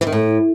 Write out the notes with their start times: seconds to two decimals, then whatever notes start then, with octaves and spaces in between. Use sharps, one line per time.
0.01 E3
0.07 D#3
0.12 A2